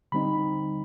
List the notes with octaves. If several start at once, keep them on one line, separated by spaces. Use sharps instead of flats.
D3 G3 C4 D#4 B5